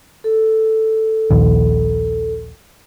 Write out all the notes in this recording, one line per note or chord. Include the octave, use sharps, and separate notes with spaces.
A4
A#1 D#2